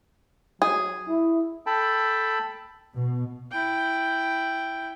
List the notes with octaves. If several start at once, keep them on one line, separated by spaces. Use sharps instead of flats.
F#3 G#4
E4
A4 G5 A5 B5
B2
E4 G5